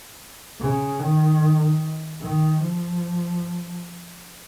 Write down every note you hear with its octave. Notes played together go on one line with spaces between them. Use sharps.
C#3
D#3
D#3
F3